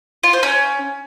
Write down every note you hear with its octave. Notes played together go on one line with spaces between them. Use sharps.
F4
C5
C#4